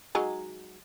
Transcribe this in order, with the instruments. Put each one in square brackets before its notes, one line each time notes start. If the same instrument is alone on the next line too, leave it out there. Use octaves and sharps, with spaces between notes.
[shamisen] F#3 G#3 D#4